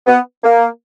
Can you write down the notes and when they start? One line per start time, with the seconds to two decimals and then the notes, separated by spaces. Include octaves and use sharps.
0.07 B3
0.44 A#3